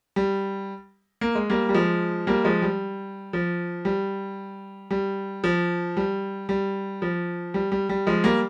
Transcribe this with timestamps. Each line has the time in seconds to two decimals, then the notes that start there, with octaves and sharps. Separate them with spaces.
0.16 G3
1.21 A#3
1.35 G#3
1.50 G3 A#3
1.69 G3
1.74 F3 G#3
2.27 G3 A#3
2.44 F3 G#3
2.62 G3
3.33 F3
3.85 G3
4.91 G3
5.44 F3
5.97 G3
6.49 G3
7.02 F3
7.54 G3
7.72 G3
7.89 G3
8.07 F3 G#3
8.24 G3 A#3